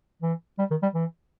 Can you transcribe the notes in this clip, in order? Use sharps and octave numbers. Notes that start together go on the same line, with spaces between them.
E3
G3
D#3
G3
E3